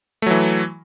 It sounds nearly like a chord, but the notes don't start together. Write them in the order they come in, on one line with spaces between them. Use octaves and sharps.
A3 F#3 E3